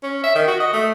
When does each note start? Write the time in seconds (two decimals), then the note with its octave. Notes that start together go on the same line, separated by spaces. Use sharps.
0.03 C#4
0.23 E5
0.35 D#3
0.48 F#4
0.60 D#5
0.73 A3